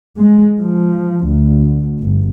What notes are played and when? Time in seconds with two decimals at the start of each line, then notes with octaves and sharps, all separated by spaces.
0.19 G#3
0.58 F3
1.25 D2
2.00 G1